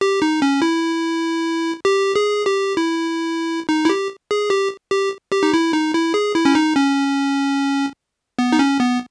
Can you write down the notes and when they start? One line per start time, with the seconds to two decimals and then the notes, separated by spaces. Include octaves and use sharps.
0.01 G4
0.22 D#4
0.42 C#4
0.62 E4
1.85 G4
2.16 G#4
2.46 G4
2.77 E4
3.69 D#4
3.85 E4
3.89 G4
4.31 G#4
4.50 G4
4.91 G4
5.32 G4
5.43 D#4
5.54 E4
5.73 D#4
5.94 E4
6.14 G#4
6.35 E4
6.45 C#4
6.55 D#4
6.75 C#4
8.39 B3
8.52 D#4
8.59 C#4
8.80 B3